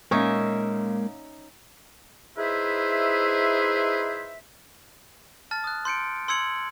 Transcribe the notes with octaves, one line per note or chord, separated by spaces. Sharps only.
A#2 G#3 A#3 C#4 D#4 A#4 E5
D#4 E4 G#4 B4 C5 E5
A5 F6 A6
D#6 F#6
C6 G6 C#7 D7
C6 E6 G#6 C#7 F#7